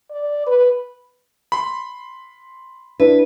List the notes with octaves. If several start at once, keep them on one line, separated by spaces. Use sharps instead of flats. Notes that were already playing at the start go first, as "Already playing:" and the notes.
D5
B4
B5 C6
D4 E4 B4